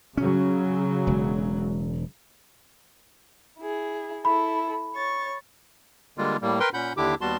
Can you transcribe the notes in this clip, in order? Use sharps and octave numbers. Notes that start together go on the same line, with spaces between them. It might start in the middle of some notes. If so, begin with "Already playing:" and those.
C#3 F#3 C#4
E1 G#3
E4 G#4
E4 A4 B5
C#5 C#6 A6
D3 G3 G#3 A#3 F4
A2 G3 A#3
A#4 B4 G5 C6
A#2 C#4 F#5 B5 G6
D#2 D3 D4 E4 G4 D6
D#2 G3 B3 F#4 A5 C6